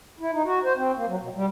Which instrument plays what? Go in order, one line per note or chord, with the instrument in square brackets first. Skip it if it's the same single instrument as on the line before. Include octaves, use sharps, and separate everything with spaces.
[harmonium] E4
D#4
F#4
C5
C4
A#3
F#3
B2
G3